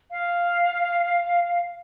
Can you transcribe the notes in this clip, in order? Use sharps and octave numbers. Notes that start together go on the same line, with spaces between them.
F5